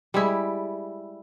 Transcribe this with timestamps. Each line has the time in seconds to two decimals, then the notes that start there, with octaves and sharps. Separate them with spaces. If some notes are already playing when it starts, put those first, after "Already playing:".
0.14 G3 G#3 E4